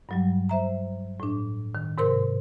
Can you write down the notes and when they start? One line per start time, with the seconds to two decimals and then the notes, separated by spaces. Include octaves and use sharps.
0.09 G2 F#3 G3
0.49 C5 E5 A#5
1.20 A2 D4
1.75 D#3
1.98 G#2 C3 A#4 C5 C6